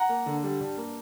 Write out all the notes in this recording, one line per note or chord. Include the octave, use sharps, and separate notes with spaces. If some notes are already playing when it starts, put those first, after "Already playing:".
Already playing: F#5 A#5
A#3
D3
G3
G2
A#3